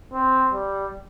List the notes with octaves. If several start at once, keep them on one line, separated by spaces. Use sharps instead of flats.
C4
G3